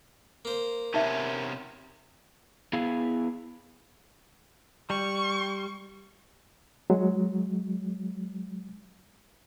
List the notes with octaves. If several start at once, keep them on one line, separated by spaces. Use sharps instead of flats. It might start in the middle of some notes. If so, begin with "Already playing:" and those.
A#3 C5
C3 B3 C#4 D#4 E5
B3 E4 G#4 F5
G3 C#6
F#3 G#3